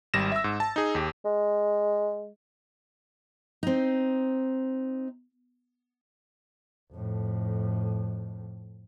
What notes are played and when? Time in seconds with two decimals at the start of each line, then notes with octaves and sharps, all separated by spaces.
0.14 G#1 G3 A#6 E7
0.32 E5 E6
0.44 G#2
0.60 A5
0.76 D#4 G#4
0.95 D#2 G4
1.25 G#3
3.63 C4 D#4
6.93 F2 A2